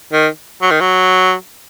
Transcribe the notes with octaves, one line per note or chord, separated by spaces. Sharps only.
D#3
F#3
D#3
F#3